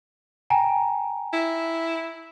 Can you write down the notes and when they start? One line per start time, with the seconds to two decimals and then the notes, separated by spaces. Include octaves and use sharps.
0.50 G5 G#5 A#5
1.33 E4